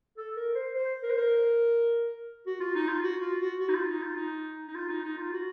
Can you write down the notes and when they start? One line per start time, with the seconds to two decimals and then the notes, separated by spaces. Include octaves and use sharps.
0.17 A4
0.37 A#4
0.55 C5
0.74 C5
1.03 A#4
1.10 C5
1.18 A#4
2.46 F#4
2.60 F4
2.75 D#4
2.88 F4
3.03 F#4
3.22 F4
3.41 F#4
3.60 F#4
3.69 D#4
3.74 F4
3.89 D#4
4.03 F4
4.17 D#4
4.68 D#4
4.75 F4
4.89 D#4
5.03 D#4
5.18 F4
5.32 F#4